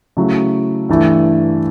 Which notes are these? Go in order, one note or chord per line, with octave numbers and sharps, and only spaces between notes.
C#3 F#3 A3 E4
G2 E3 A3 E4